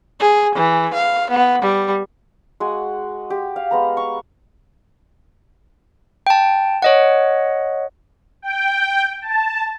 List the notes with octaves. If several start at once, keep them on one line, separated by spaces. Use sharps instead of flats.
G#4
E3
F5
B3
G3
G#3 F#4 F#5 G#5
G4
F5
G#3 B3 A#5
C#6
G5 A5
C#5 D#5 F#5
G5
A5